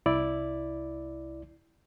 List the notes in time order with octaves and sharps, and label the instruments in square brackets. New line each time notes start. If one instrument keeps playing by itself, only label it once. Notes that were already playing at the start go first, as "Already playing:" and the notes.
[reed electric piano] C2 E4 D5